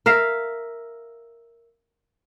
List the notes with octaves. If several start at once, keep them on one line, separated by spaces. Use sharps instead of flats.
A#4 E5 F5